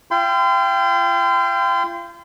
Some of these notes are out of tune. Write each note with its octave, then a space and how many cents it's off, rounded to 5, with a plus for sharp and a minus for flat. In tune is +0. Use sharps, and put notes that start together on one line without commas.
F4 -40 G5 +0 C6 -35